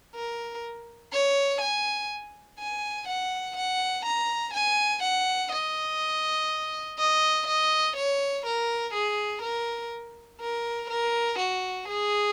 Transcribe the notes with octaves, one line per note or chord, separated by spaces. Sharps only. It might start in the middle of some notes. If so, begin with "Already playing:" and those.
A#4
C#5
G#5
G#5
F#5
F#5
A#5
G#5
F#5
D#5
D#5
D#5
C#5
A#4
G#4
A#4
A#4
A#4
F#4
G#4